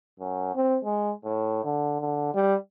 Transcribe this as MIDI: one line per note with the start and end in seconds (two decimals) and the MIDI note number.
0.20 0.53 42
0.55 0.79 60
0.84 1.11 56
1.24 1.64 45
1.65 2.00 50
2.00 2.30 50
2.34 2.55 55